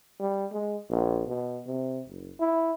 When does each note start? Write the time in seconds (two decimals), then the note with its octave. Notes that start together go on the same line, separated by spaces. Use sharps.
0.20 G3
0.52 G#3
0.90 A#1
1.27 B2
1.67 C3
2.08 F#1
2.40 E4